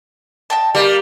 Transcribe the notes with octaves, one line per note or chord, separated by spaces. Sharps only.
D#5 G5 A5
G3 A#3